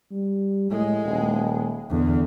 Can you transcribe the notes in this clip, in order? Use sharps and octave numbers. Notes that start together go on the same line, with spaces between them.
G3
A2 G#3
D#1
E2 D3